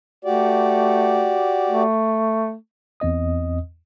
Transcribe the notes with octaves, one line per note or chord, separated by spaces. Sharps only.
A3 F#4 G4 D5
A3
E2 C4 D#5 D#6